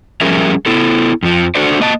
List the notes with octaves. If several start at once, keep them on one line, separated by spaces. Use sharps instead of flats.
F3 G3 C#4 G#4 A#4 E5
B3 E4 A4
F2 F3
D4 F#4 A4 C5 D5
A#3 D#5 A5